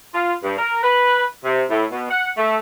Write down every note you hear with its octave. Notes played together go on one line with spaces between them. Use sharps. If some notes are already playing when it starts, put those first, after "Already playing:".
F4
G2
A#4
B4
C3
A2
B2
F#5
A3